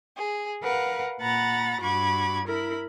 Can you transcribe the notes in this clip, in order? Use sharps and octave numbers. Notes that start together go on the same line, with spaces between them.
G#4
A#4 B4 F5 F#5
A#2 F#5 A#5 B5 A6
G2 F#4 B5 D6 G#6
E4 A#4 B5